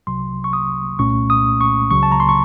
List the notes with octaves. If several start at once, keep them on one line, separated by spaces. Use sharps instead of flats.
C2 C3 F#3 C6
C#6
D#6
C2 A#2 A3 C#4 C#6
D#6
C#6
C#2 C#3 F#3 C#6
A5
A#5
C6
C#6